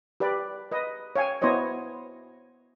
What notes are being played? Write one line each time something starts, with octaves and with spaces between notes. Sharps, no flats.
G4 B4 D5 G5
B4 D#5
C#5 F5 G5 G#5
B3 E4 C5 C#5 D#5